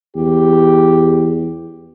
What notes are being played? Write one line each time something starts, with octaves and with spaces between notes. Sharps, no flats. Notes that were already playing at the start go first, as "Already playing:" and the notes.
E2 G4